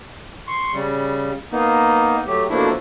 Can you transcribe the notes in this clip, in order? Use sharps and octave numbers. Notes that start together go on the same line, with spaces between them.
C6 C#6
C#3 G3
A#3 B3 D#4
F#3 A3 G4
B2 F3 A3 A#3 D4 E4